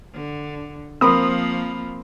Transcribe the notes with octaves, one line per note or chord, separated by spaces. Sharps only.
D3
F3 A#3 C4 A#4 B5 D#6